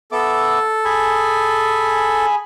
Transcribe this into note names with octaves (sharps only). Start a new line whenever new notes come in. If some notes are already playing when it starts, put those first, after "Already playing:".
B3 A4 E5 D6
G#4 G#5 B5